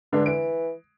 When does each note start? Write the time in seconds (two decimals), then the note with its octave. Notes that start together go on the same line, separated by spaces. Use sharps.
0.13 G2 D3 G#3 D4
0.26 E3 D7